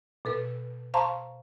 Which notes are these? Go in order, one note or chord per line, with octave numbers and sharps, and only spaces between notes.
B2 A4 B4
C5 F5 A5 A#5 C6 C#6